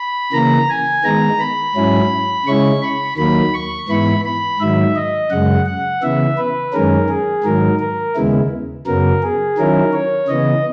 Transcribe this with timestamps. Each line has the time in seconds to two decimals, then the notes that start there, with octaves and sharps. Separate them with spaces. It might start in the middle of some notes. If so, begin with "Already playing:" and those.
Already playing: B5
0.33 C#3 E3 A#3 A#5
0.69 G#5
1.04 D#3 G#3 B3 D#4 A#5
1.39 B5
1.75 G#2 F#3 C#4 E4
2.46 C#3 G#3 C#4 E4 C#6
2.82 B5
3.17 D#2 D#3 F#3 A#3 B5
3.54 C#6
3.88 G#2 E3 B3 E4 B5
4.25 B5
4.59 G#2 D#3 F#3 E5
4.96 D#5
5.31 F#2 C#3 G#3 F#5
5.66 F#5
6.03 C#3 E3 B3 E5
6.38 B4
6.73 F#2 D#3 G#3 C#4 A#4
7.08 G#4
7.44 G#2 D#3 F#3 A#4
7.79 A#4
8.15 D#2 C#3 G#3 B3 E4
8.86 F#2 C#3 F#3 B3 A#4
9.23 G#4
9.58 D#3 F#3 C#4 E4 A#4
9.93 C#5
10.28 C#3 E3 B3 D#5